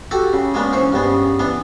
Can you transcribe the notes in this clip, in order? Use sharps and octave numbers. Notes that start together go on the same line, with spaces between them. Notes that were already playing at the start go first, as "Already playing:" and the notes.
F#4 G4 A4 F#5
C#3
G#3 A#3 B3 C#4 D4
E3 C#4 C5 C#6
G2 C#3 B3 C#4
E3 B3 D4